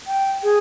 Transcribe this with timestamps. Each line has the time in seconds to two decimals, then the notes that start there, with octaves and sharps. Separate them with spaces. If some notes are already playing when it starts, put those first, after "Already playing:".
0.07 G5
0.43 G#4